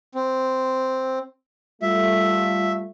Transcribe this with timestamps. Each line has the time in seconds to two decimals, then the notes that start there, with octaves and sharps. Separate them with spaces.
0.15 C4
1.82 G3 A3 F4 E5